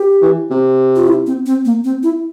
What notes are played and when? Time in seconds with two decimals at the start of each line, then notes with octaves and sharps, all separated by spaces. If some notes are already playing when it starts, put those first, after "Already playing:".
Already playing: G4
0.22 E3
0.50 C3
0.96 F4
1.07 E4
1.27 C4
1.46 C4
1.65 A#3
1.84 C4
2.03 E4